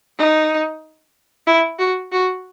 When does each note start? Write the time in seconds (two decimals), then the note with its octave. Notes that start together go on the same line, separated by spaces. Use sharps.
0.18 D#4
1.47 E4
1.79 F#4
2.12 F#4